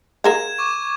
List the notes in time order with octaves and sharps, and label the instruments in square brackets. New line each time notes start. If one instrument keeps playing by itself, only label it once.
[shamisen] G#4 A#4 F5 [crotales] G#6 E7
[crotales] C#6 D6